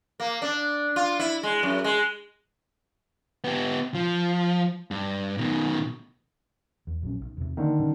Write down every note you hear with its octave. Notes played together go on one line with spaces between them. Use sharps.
A#3
D4
F4
E4
G#3
F#2
G#3
B3 G4
F3
G2
B2 D#3
E2
A#1 F#3 C#4
B1
E2 C3
D3 D#3 A#3
B2 G3 C#4